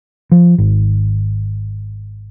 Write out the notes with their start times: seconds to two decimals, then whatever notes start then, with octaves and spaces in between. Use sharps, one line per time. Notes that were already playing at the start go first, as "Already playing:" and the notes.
0.32 F3
0.58 G#1